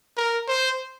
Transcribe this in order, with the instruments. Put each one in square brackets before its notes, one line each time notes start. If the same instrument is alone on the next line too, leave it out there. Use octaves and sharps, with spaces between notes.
[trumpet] A#4
C5